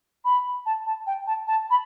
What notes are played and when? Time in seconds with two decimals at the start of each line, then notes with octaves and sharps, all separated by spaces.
0.25 B5
0.66 A5
0.86 A5
1.07 G5
1.27 A5
1.47 A5
1.70 B5